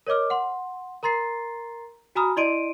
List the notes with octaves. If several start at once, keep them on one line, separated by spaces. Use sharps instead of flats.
A#4 C#5 D#5 D6 F6
F#5 C6
A#4 A#5 C6 A6 C7
F#4 G#5 A#5 B5 D#6 F6
E4 D5 D#5 C6 D7 D#7